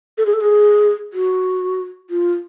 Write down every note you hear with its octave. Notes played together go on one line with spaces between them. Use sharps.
A4
G#4
A4
G#4
F#4
F4